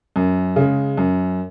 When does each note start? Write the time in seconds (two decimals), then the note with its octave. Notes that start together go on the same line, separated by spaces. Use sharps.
0.16 F#2
0.56 C#3 G#3
0.97 F#2